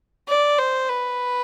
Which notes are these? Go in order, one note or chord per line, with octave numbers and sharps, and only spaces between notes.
D5
C5
B4